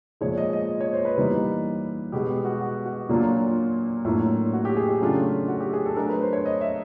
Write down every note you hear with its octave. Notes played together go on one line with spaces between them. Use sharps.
A#2 F3 G#3 C#5
D#5
D#5
C#5
C5
B4
E3 G3 A#3 D#4
B2 G#3 B3 G4
F#4
F#4
F#4
A#2 F#3 A#3 D4 F4
A2 F#3 A#3 D4 F4
F#4
G4
G#4
G4
C#3 F#3 A3 D4 F4
F#4
G4
G#4
A4
F#3 A3 D4 A#4
B4
C5
C#5
D#5
E5